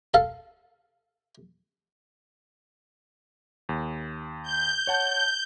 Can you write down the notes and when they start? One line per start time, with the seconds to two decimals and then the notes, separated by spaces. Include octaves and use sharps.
0.14 A4 F5
3.69 D#2
4.43 G6
4.87 C#5 F#5 A5